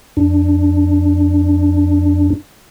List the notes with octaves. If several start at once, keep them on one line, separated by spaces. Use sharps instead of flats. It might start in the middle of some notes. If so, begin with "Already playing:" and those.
F2 D4